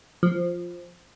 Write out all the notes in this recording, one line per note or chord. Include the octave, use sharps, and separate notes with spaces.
F3